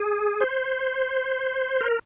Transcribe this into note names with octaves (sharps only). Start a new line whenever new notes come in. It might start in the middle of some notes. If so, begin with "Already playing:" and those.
Already playing: G#4
C5
A#4